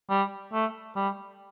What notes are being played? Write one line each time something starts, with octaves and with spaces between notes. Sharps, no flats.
G3
A3
G3